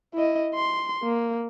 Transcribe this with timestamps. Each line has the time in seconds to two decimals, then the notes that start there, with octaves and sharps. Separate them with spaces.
0.15 E4 D#5
0.55 C6
1.04 A#3